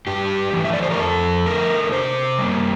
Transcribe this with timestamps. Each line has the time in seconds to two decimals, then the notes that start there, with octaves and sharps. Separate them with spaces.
0.07 G2 G4
0.53 E3 A3
0.65 E5
0.73 D5
0.83 C5
0.91 A#4
0.99 F2 A4
1.46 D3 A3 A#4
1.92 C3 C5
2.39 G3 A#3